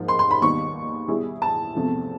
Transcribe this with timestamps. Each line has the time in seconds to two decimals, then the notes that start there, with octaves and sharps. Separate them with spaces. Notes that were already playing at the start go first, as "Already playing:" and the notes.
Already playing: G#2 F3 A#3 D#4
0.08 C6
0.19 C6
0.31 B5
0.42 D#2 D#3 G3 B3 D#4 C#6
1.08 G3 B3 E4 G#4
1.42 A5
1.75 E2 C3 F3 A3